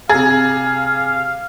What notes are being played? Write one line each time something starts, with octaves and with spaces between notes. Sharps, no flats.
C3 G#4 F5 A6